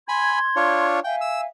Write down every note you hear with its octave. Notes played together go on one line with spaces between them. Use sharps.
G#5 B5 C6 G#6
D4 F4 C#5
E5 F5 G5 G#5
E6